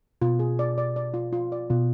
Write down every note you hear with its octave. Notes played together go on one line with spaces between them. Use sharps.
B2 F4
G#4
D5
D5
D5
F4
F4
D5
B2 F4